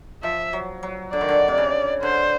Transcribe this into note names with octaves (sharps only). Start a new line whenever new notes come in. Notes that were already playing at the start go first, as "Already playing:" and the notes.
F3 E5
F#3
F#3
D3 D5
D#3
D3
C3
C#3
D3 C5